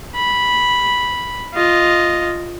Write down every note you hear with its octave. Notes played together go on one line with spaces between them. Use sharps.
B5
F4 D#5